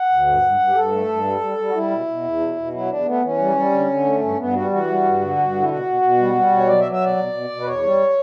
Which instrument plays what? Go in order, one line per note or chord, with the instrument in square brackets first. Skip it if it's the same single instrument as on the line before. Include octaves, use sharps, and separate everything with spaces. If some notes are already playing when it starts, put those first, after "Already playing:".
Already playing: [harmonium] F#5
D2
G2
G2
G2
G4
G2 A4
A3
G2
G3
G3
G3
F#4
G3 E4
B2
B2
E2
B2
B2
F#3 E4
E2 D4
A3 B3
E3 C#4
G3
G3
D3
D3
A3
G2 C#4
G2 B3
G3 F#4
E3 F#4
G3
G2
D3
G2
D3
E4
B2 F#4
B2
B2
G3
G3
B2
C#5
F#3 D5
E5
F#3
E5
B2 D5
B2
B2
B2
B4
E2 C#5
G3